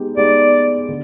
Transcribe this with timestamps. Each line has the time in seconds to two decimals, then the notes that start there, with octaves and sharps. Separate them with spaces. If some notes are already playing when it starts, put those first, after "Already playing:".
Already playing: G#3 B3 D#4 G4
0.17 G#3 B3 D#4 G4 D5
0.89 D3